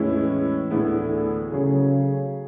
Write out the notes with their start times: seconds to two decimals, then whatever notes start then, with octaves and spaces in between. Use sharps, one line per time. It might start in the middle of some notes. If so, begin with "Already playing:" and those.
Already playing: E2 A2 E3 G#3 C#4 E4
0.70 D2 A2 D3 E3 B3 E4 G#4
1.51 C#3 F#3 A3 C#4 G#4